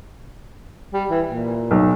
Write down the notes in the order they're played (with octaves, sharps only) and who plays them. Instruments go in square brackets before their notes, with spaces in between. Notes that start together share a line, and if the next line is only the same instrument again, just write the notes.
[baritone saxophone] G3
E3
A#2
[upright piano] B1